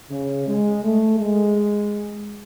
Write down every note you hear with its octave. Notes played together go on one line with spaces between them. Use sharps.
C#3
G#3
A3
G#3